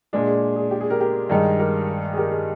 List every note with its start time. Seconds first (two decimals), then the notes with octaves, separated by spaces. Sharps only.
0.13 A#2 G#3 D4 G#4
0.28 G#4
0.56 G#4
0.71 G4
0.81 G#4
0.90 G4 A#4
1.00 G4 A#4
1.29 G2 D#3 G#3 D#4
1.59 G4 A#4
2.13 G#4
2.17 G4 A#4
2.32 G#4